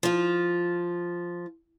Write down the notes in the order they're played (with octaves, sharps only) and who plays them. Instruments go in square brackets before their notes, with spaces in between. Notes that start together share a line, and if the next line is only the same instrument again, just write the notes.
[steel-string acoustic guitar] F3 F4